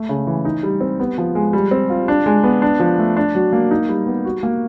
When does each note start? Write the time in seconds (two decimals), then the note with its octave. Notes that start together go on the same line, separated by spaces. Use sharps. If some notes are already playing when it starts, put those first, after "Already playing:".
Already playing: A3
0.09 C#3
0.27 E3
0.45 D#4
0.63 G3
0.81 C4
1.00 B3
1.18 F3
1.35 G#3
1.53 G3
1.71 C4
1.90 F4
2.08 D4
2.26 G#3
2.44 B3
2.62 D4
2.80 F3
2.98 A3
3.17 D4
3.35 F#3
3.53 A#3
3.71 D#4
3.89 G3
4.06 B3
4.25 F#4
4.43 A#3